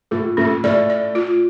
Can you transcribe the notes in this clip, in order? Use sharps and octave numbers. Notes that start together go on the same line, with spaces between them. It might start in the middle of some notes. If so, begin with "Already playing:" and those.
A2 A3 F4
A2 A3 C#4
A2 A3 D5
D5
F4